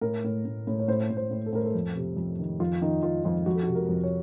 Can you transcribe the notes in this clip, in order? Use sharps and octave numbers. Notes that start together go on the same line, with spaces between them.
A2 A#4
A2
A2
A2
C#5
A2 C5
A2
C5
A2
A4
A2 A#4
A4
F2
C3
F2
D#3
F2 F4
D#3 D#4
D#3 F4
F2 F4
F2 F#4
A4
F#4
C3
A#4
F2
C#5